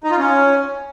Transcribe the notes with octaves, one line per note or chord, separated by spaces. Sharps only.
D#4
F4
C#4